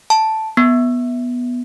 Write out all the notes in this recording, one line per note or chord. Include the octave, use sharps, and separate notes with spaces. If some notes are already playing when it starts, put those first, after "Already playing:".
A5
B3